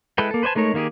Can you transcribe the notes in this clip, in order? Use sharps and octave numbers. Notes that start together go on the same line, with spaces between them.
G#3 E4 A4 B4 G5
A#3 A4
B4 C5 D5 G#5 A5
G#3 A3 D#4 A#4 C#5
D#3 A#3 D#4 G4 G#4